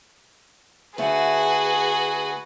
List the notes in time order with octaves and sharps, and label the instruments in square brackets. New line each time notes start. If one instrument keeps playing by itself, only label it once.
[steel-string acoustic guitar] D3 A3 F#5 [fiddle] F#4 B4 [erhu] G#4